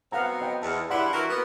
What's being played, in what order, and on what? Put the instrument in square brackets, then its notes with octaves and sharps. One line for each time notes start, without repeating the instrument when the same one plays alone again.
[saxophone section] F#3 B3 C4 [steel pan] F5 F#5 A#5
[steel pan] D#5 G5
[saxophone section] E2 [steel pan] A5
[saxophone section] G2 E4 [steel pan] D5 F#5 C6
[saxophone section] E3 F#4 A#4
A#3 B3